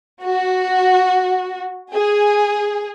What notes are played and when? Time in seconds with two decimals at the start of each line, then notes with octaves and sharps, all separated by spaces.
0.22 F#4
1.93 G#4